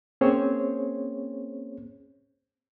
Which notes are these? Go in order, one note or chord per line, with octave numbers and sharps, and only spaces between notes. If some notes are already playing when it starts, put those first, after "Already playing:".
A#3 C4 C#4 G#4 C5 C#5